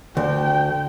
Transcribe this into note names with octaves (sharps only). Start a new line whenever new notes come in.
D2 G5